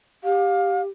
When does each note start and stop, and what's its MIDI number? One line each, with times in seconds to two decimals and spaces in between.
0.24 0.88 67
0.24 0.82 77